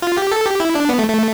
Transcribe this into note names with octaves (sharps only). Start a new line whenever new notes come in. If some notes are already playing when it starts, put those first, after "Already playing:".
F4
G4
A4
G4
E4
D4
B3
A3
A3